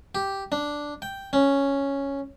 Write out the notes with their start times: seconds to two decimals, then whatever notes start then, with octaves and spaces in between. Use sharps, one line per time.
0.15 G4
0.52 D4
1.02 G5
1.33 C#4